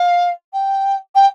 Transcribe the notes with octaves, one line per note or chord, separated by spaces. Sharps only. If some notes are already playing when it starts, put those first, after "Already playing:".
Already playing: F5
G5
G5